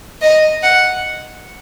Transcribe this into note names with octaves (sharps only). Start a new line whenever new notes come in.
D#5
F#5